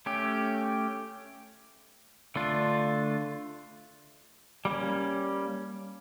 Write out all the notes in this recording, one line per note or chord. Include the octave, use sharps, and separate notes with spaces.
A3 C#4 G4
D3 A3 D4 F4
G3 A#3 C#4